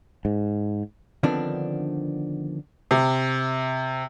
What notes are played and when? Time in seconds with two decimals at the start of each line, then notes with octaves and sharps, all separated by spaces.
0.25 G#2
1.23 D3 D#3 F3 B3 C4 D4
2.91 C3